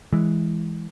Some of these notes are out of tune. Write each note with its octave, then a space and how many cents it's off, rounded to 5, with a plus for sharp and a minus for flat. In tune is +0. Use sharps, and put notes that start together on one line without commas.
E3 +0 G#3 +0